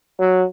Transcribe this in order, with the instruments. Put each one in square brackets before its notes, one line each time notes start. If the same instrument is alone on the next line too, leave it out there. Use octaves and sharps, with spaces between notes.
[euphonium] F#3